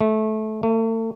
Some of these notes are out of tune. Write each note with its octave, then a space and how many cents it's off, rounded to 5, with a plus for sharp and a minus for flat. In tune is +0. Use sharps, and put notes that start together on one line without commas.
A3 -20
A3 +40